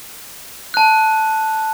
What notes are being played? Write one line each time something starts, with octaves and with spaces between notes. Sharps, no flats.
A5 F#6